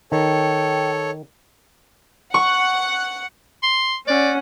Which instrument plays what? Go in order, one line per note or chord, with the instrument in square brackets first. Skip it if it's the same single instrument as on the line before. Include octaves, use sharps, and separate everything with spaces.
[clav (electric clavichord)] D#3 [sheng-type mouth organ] A4 C#5 [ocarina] G5
[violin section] F#5 [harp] C#6
[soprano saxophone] C6
[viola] C#4 F#5 [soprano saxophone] D5